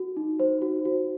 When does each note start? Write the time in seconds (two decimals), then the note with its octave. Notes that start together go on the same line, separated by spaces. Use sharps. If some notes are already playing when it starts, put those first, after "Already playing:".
Already playing: F#4
0.17 D#4
0.39 C5
0.62 F#4
0.85 F#4